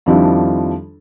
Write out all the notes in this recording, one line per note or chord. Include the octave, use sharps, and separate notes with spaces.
F2 D#3 F3 G3 D4 E4